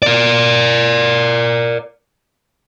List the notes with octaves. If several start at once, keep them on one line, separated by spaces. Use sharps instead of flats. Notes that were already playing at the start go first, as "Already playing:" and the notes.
A#4 D5